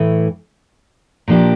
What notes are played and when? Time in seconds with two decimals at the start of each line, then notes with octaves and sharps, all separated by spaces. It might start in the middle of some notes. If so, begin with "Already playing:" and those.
Already playing: A2 E3 A3
1.28 A#2 F3 A#3 D4 G4